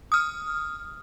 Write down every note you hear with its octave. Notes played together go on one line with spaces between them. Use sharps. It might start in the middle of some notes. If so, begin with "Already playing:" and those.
D#6 F6